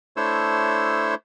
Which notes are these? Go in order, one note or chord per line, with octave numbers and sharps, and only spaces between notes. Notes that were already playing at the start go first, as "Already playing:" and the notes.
A3 D4 E4 C5 C#5 E6